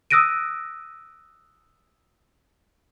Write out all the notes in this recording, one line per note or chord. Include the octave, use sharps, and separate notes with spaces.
D#6 E6 F#6 A#6 D7 D#7